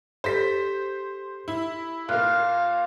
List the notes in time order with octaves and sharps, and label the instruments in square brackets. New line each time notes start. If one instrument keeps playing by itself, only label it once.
[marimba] G4 A4 [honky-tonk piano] C5 B6
[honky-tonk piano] E4
[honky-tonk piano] A#2 A#3 [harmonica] F5 [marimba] F6 F#6